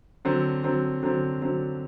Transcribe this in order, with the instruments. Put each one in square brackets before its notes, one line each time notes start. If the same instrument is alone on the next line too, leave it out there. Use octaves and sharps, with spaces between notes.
[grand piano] D3 F#3 C4
D3 F#3 C4
D3 F#3 C4
D3 F#3 C4